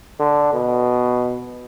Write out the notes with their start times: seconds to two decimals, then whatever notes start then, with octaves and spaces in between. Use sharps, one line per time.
0.19 D3
0.53 B2